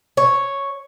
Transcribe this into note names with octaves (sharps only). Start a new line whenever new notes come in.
C#5